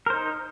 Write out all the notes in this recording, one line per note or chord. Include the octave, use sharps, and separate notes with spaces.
D#4 A#4 C5